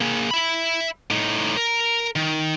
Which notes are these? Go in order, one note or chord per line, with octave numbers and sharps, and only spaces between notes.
A#3 G#4
E5 B5
A2 D#4
A#4
D#3